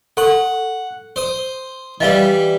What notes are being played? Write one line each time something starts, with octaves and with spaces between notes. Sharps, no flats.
A4 F#5 C#6
C5 D#6
E3 G3 D#5 F5 E6